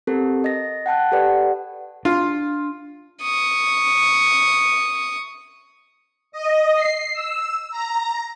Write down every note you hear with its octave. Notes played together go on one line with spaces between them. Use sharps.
C4 G4 A4 A#4
D#5 A#6
F#5 G5 A5 F#6
G4 A4 B4 D5 F#5
D4 F4
C#6 D#6
D#5
C7
E6
A#5